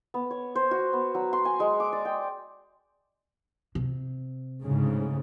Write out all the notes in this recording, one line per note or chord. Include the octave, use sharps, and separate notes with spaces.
B3
C#5
C5
F#4
B3
F#3
C6
G#5
G#3
D6
D5
G5
C3
D2 G#2 C#3